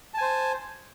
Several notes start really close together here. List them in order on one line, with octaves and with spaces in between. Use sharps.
A5 G#5 C5